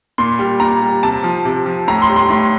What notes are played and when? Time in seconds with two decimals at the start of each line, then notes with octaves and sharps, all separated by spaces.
0.18 A#2 C6
0.39 G3
0.60 A#2 A#5
0.82 G3
1.03 C3 A5
1.24 F3
1.45 C3
1.66 F3
1.88 A2 A#5
2.02 C6
2.09 G3
2.16 C6
2.30 A2 C6